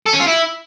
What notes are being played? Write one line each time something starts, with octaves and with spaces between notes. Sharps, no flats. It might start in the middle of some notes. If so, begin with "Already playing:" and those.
A4
C#4
F4
E4